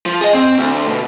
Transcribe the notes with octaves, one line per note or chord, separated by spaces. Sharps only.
F3
G#4 D#5
C4
D2
B2